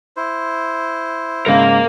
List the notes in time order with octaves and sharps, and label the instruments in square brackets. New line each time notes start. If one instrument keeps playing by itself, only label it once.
[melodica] E4 C5
[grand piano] G#2 C#3 [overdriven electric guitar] A#4 F5